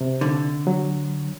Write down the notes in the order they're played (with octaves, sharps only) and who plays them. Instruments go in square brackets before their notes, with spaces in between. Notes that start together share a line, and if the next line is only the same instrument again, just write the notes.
[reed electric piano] C3
[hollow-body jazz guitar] D3
[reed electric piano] F#3